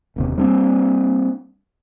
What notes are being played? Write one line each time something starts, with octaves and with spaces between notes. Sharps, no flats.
E1 D#2 C3
G3 A#3 C4 D4